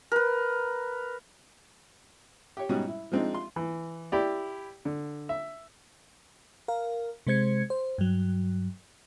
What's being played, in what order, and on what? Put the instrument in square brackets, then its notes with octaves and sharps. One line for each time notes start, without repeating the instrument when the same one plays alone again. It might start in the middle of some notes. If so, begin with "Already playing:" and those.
[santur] A#4 B4
[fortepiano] G4 C#5
G#2 B2 G3 C#4 D#4 F#4
E4
F3 G#3 C4 D4 D#4
F4 C6
E3
E4 G4 D5
D3
E5
[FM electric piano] A#4 F5
C3 G#3 C5 G#6 C#7
C5
G2 F#3